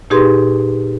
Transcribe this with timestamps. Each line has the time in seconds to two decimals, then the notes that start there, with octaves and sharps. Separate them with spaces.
0.10 A#2 D#4 G4 G#4 B4 C6